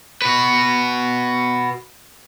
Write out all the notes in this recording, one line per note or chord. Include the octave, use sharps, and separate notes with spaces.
F#4 B4